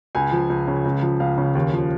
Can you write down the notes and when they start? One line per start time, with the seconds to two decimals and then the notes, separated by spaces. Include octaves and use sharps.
0.15 C#2 G#5
0.32 F3
0.50 C#2
0.68 C#3
0.85 C#2
1.02 F3
1.20 C#2 F5
1.38 C#3
1.55 D#2
1.73 F3